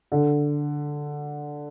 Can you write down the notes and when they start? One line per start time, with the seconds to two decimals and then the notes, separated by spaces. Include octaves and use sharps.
0.12 D3